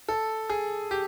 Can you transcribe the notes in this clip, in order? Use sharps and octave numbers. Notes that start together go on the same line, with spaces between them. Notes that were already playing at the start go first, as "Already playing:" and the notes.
A4
G#4
G4